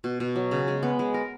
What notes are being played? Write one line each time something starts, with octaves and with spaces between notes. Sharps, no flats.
B2
B2
F#3
C#3
G#3
B3
G#3
A#4